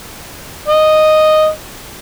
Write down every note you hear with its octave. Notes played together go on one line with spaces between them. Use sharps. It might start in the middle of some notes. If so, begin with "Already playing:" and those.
D#5